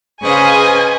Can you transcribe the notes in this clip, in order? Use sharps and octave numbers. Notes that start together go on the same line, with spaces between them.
C#3 G#4 B4 C5 D#5 F5 G#5 C#6